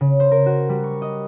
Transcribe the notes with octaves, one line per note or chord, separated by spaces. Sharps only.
C#3
C5
A#4
F#4
G3
C#6
D#5